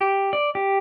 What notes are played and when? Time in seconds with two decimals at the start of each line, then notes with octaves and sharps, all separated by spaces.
0.01 G4
0.33 D5
0.55 G4